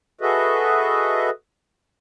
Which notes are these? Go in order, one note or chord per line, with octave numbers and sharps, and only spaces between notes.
F#4 G#4 A4 B4 D#5 E5